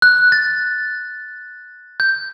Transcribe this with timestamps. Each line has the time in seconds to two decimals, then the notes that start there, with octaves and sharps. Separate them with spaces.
0.02 F#6
0.32 A6
2.00 G6